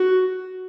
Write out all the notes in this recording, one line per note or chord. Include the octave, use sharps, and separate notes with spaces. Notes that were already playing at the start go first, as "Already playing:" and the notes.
Already playing: F#4